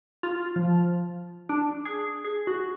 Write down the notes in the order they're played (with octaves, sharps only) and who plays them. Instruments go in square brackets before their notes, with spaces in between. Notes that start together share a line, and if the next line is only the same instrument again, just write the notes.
[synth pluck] F4
F3
D4
G#4
G#4
F#4